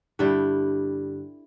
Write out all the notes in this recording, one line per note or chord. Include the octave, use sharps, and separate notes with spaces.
G2 D3 G3 E4